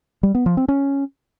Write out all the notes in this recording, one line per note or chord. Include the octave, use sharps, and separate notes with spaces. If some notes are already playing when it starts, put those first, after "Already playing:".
G3
B3
F3
C4
C#4